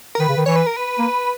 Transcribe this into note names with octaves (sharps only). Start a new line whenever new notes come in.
A#4
D#3 B4
C#3
D#3
E3 C#5
B4
A#4
B4
A#3